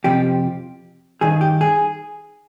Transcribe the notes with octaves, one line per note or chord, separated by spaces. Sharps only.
F2 C3 F3 G4
G2 D#3 G#4
G4
G#4